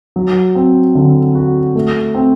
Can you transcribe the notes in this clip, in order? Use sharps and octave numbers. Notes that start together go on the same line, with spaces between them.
F#3
C4
D3
F#4
A3
C4